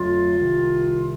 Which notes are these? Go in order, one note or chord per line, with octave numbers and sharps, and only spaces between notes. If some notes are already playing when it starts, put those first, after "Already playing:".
Already playing: F2 D3 F#3 A3 F4
C2 C3 D#3